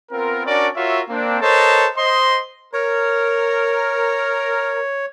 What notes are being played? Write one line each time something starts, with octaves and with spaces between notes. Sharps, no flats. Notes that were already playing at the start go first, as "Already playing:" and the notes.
B3 C4 F4 A#4
C#4 D4 F#4 A#4 D5
F4 F#4 A#4 C#5 E5
A#3 C4 D4
A4 A#4 C5 C#5 D#5 A5
C5 D#5 C6
A#4 C#5